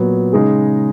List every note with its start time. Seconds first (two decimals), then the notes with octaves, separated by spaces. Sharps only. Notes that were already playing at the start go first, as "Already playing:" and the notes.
Already playing: A#2 F#3 B3
0.33 C#3 G#3 D#4 G#4